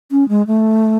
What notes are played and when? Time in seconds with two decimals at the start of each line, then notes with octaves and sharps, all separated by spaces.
0.12 C#4
0.29 G#3
0.47 A3